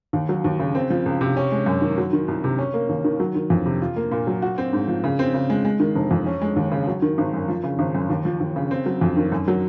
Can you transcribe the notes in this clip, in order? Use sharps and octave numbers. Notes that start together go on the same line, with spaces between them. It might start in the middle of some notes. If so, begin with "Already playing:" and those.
D#2
F#3
D#2
C#3
C4
F3
C#2
C3
C#4
G#3
F#2
D#3
F#3
D#3
C2
C3
C#4
A#3
D#2
D#3
F#3
D#3
F2
C3
F4
A#3
A#2
F#3
F#4
C4
G#2
F3
C#3
C4
C#3
G#3
G#3
D#3
F1
F2
C#4
G#3
D#2
C#3
F#3
D#3
G#1
F#2
F3
C#3
G#1
F#2
D#2
F3
D#2
C#3
C4
F#3
F2
D#3
F#2
F#3